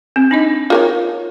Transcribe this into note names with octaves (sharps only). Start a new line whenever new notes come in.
C4
D4 D#4 D#5
F4 A#4 C#5